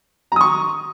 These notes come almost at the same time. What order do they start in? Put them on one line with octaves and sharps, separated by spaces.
A#5 D#6 C#6